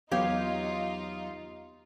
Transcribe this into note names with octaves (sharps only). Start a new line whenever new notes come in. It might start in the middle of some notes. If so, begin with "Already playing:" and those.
E2 F#3 B3 D#4 F4 G4 C#5 F5